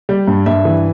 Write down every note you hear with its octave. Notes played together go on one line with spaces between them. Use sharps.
G3
G2
G2 E5
E3